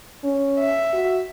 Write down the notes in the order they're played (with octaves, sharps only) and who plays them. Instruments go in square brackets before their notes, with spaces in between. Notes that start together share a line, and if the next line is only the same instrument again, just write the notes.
[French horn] C#4
[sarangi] E5
[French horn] F#4